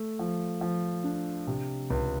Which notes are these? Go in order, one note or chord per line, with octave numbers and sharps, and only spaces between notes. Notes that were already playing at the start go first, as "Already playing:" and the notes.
Already playing: A3
F3
F3
D4
C3
C#2